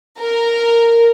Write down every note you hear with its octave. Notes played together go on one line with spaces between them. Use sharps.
A#4